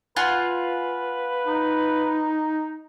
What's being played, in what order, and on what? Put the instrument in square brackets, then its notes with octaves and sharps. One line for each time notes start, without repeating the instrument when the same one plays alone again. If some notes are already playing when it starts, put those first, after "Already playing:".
[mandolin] F4 F#5 G#5 [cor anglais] B4
[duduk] D#4